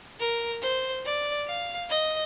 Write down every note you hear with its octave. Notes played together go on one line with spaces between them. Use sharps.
A#4
C5
D5
F5
D#5